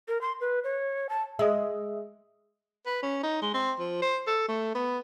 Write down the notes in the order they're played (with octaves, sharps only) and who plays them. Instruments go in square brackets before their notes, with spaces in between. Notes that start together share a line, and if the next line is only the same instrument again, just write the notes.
[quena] A#4
C6
B4
C#5
A5
[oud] G#3 [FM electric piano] D#5 E5
[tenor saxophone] B4
C#4
D#4
G#3
C4
F3
C5
A4
A3
B3